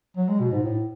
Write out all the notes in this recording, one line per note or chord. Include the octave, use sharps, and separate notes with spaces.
F#3
G#3
B2
G#2
A2